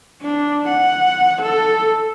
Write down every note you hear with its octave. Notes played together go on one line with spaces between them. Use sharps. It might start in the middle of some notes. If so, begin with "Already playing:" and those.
D4
F#5
A4